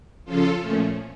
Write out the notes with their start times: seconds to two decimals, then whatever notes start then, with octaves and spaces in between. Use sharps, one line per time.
0.24 C#3 F3 C#4 F4 A4
0.60 A#2 F3 A3 C#4